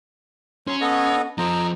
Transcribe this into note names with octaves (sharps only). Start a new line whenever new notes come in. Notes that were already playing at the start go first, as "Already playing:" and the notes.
F#3 C#4 C6
B3 A4 D#5
F3 C4 D#5 A#5